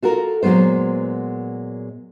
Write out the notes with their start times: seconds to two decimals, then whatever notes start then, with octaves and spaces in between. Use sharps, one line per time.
0.03 F4 F#4 A4 A#4
0.43 A#2 F#3 G#3 B3 C5